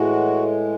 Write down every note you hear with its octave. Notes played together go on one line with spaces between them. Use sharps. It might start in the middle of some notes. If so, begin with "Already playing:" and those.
Already playing: A2 E3 G#3 F#4